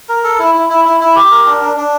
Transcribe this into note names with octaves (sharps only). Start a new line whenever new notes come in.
A#4
A4
E4
E4
E4
E4
E4
G4
A#4
D4
D4
D4